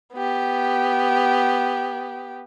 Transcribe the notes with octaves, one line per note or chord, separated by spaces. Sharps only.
B3 G4